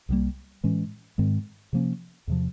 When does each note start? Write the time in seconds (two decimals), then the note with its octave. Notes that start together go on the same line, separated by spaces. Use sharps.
0.09 C2 B2 G3 A#3
0.64 A2 E3 G#3 C#4
1.18 G#2 D#3 G#3 C4
1.73 C3 F3 A#3 C#4
2.27 E2 C3 F3